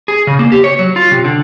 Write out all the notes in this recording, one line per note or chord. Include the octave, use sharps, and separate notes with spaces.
G#4
C#3
A#3
G4
C#5
F#3
F4
C3
D3